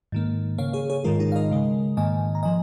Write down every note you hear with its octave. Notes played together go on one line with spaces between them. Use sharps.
G#2 D#3 A#3
C#3 A#3 C#5 F5
G#4 C#5
G#4 C#5
G#2 D#3 G#3 F4 A#4
D#4 G#4
F5
A#4 D#5
C#3 G#3
G#2 D#3 A#3 D#5 G#5
A#5
F3 D#5 G#5